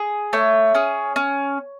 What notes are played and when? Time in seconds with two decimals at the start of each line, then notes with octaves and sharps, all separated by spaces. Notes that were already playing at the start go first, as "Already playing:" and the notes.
Already playing: G#4
0.33 A3 C#5
0.75 C#4 G#4
1.16 C#4